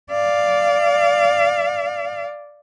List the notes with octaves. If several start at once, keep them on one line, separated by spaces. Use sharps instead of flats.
D5 F5